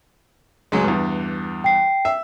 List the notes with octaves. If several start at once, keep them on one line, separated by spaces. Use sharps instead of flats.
C#2 F#3 G#3
E2 G2
G5 C7
E5